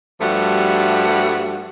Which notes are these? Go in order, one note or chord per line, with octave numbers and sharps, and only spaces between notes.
G2 F3 G3 A3 F#4